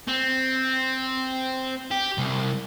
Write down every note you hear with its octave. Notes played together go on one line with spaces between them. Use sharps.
C4
G4
C2